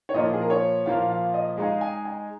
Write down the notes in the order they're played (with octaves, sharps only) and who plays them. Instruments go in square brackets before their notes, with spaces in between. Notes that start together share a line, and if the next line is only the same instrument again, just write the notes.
[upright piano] C#5
[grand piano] A#2 F3 A#3 F4 [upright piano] D#5
[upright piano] G#4
A#4
C#5
[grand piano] A#2 F3 A#3 F4 [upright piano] F5
[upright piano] F5
D#5
[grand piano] G#3 D#4 G#4 [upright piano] F5
[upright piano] G#5
G#5